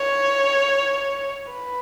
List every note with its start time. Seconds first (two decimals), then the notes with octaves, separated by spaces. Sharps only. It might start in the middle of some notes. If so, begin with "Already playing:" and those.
Already playing: C#5
1.52 B4